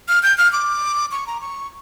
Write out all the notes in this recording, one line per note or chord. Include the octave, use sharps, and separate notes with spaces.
F6
G6
F6
D6
C#6
A#5
C#6